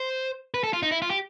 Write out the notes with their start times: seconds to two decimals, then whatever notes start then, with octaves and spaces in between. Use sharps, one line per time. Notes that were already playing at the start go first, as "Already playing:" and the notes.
Already playing: C5
0.54 B4
0.64 A4
0.73 F4
0.83 D#4
0.91 E4
1.02 F4
1.10 G4